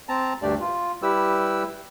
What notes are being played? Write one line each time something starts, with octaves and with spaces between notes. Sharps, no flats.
C4 A5 A#5
D2 G2 A3 D4 G4 D5
F4
G3 E4 G4 B4 E6